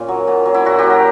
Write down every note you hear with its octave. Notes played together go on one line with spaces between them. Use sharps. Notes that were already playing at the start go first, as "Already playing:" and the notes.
Already playing: A#2 C#4
F#3
A#2
F#3
E4
A#2 F#4
F#3 G4
A#4